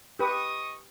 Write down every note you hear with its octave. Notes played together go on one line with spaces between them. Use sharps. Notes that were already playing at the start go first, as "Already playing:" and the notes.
G4 B4 D#5 C#6 D#6